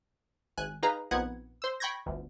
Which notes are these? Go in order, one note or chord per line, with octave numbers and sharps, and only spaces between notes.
G#1 G#5 F#6
D#4 G#4 B4 F5 A#5
A#1 B3 C4 D#4 F#5 G#6
C5 E6
G5 B5 C#6 G6 G#6 A#6
G1 D2